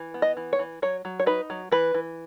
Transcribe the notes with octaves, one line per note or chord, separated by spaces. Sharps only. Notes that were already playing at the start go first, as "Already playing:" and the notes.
Already playing: E3
B3
D#5
E3
C#5
E3
F#3 C#5
F#3
C#5
D#4 B4
F#3
E3 B4
E3